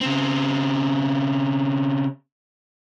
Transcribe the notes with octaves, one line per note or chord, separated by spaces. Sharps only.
C#3 C4